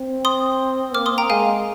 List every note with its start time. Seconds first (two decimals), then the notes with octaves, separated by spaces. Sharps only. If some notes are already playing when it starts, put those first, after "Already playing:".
Already playing: C4
0.25 C6 D#6
0.94 A#3 D6 F6
1.06 C6 D#6
1.18 G5 A#5
1.30 G#3 F5 G#5